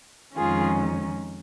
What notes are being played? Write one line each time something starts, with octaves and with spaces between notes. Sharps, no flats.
F2 D#3 G#3 C#4 F4 G#4